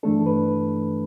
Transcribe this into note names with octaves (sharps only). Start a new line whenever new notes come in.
G2 E3 A3 D4 A4
B4